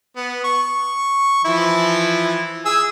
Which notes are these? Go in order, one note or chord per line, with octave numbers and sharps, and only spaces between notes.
B3
C#6
E3 F3 E4
G#4 E6